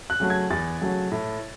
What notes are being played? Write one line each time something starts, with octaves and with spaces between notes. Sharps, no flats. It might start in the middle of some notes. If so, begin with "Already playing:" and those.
F#6
C#3 F#3 A3
G#6
E2 A6
C#3 F#3 A3
A2